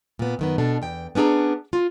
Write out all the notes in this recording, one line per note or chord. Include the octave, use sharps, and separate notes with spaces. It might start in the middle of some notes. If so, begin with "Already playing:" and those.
A#2 B3
F#2 D#3 B3
B2 D4 A4
E2 G5
B3 C#4 D4 G#4 A#5
F4